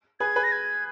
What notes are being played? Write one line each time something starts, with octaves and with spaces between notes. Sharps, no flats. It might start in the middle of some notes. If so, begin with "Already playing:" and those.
G#4 B4 G#6
G#4 B4
A#6
G#6